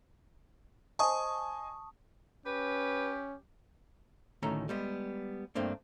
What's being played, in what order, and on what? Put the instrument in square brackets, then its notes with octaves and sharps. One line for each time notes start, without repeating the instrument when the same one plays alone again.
[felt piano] C5 D#5 G#5 [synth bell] A5 C#6 D#6
[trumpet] C#4 [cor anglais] G4 [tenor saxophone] B4
[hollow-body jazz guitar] D2 A2 D#3 C#4 A4 A#5
G3 G#3 B3
G2 A3 A#3 C4 D4